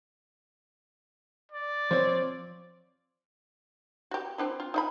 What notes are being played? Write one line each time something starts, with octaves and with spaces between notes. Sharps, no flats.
D5
F3 C4 C5 C#5
F#4 G4
C4 D4 E4
F4
D#4 D#5 B5